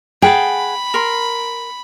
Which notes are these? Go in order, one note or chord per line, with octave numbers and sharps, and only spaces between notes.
G#4 F#5 G5 A5 B5
A#4 C6